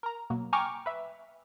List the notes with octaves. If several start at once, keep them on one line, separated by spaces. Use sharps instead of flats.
A#4 A#5
B2 F#3 A#3
G5 G#5 A#5 C#6 D6 F6
B4 E5